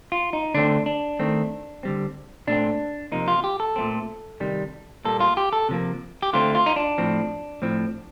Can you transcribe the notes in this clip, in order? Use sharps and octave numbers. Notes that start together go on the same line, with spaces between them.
F4
D#4
D3 A3 C4 D4
D4
D#3 A3 C4
D3 G3 C4
A#2 A3 C4 D4
C3 F3 A#3 D#4
F4
G4
A4
A#2 A3 C4
C3 D#3 G3
A#2 G3 A#3 A4
F4
G4
A4
C3 F3 A#3
G4
D3 A3 C4 F4
F4
D#4
D4
A2 F3 C4
A2 F3 C4